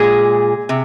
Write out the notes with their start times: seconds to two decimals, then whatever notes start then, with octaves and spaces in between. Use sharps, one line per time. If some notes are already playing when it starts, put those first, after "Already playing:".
Already playing: A#2 G#3 G#4
0.69 C3